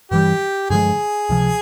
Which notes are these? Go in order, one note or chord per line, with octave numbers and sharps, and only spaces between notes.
G2 E3 G3 G4
G2 D3 F3 G#3 G#4
C#2 C3 F3